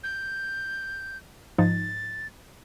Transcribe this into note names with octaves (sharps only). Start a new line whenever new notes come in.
G6
G#2 F3 D#4 A6